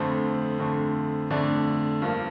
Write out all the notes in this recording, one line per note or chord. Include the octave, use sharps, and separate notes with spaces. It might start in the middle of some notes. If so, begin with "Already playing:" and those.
Already playing: F2 D3 A3 C5
F2 D3 A3
F2 D3 A3 D5
G2 F3 A#3